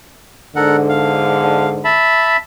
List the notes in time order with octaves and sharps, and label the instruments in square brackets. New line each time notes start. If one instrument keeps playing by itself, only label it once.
[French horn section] E2 G#2 D3 [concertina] A4 A#4 F#5
[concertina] F5
E5 A5 B5